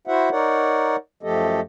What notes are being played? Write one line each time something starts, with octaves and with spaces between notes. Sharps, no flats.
E4 F#4 C5 E5 F#5
D#4 A#4 C#5 D5 F#5
F#2 F3 A3 G4 A4 D#5